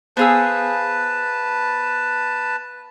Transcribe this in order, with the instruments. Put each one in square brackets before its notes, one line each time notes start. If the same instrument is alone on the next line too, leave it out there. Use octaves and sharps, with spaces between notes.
[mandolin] B3 G#4 E6 [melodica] B4 A5 [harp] C5 F5 G#5